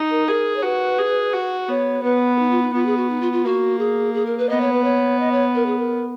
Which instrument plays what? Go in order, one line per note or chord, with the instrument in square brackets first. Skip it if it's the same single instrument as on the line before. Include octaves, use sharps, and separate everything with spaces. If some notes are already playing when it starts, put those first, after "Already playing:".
Already playing: [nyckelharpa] D#4
[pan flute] A#4
[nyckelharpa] G#4 [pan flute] A#4
[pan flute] C#5
[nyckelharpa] F#4 [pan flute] B4
[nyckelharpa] G#4
F#4
[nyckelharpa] B3 [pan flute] C#5
[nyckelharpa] B3 [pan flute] B4
[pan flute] D#4
F4
D#4
[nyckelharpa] B3 [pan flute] F4
[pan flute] G#4
F#4
D#4
F4
F4
[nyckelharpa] A#3 [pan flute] F#4
[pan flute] G#4
G#4
A#4
B4
[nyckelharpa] B3 [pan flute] D#5
[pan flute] C#5
B4
C#5
D#5
C#5
A#4
G#4
A#4